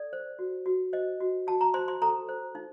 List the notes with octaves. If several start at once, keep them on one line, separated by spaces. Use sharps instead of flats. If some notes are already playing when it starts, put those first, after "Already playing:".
Already playing: A4 D5
C5
F#4
F#4
C5 D#5
F#4
F#4 A5
A#5
C5 C6
C6
A4 A#5
C5
D#4